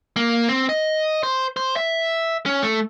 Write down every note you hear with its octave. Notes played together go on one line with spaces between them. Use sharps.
A#3
C4
D#5
C5
C5
E5
C#4
A3